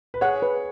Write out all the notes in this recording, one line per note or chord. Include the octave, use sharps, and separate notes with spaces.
B4
G#4 C#5 F#5
B4